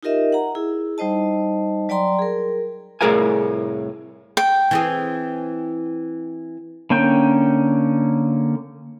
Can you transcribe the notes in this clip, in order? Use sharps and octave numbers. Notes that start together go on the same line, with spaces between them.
D#4 F4 G4 A#4 D#5 E5
F#5 A#5
E4 G#4
G3 D#4 C5 D#5 A5
F#3 D5 G5 A#5 C6
G#4 A#4
C2 A2 G#4 A#4 F5 G#5
G5
E3 C4 G#4
D3 A#3 C#4 G5